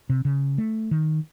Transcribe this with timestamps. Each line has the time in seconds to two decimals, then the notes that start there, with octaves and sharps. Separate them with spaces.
0.09 C3
0.25 C#3
0.58 A3
0.91 D#3